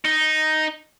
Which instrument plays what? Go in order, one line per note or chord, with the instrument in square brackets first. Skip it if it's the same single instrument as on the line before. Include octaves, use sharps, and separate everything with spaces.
[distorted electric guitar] D#4